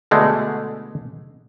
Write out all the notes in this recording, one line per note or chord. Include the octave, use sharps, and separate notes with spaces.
B2 D3 G#3 A3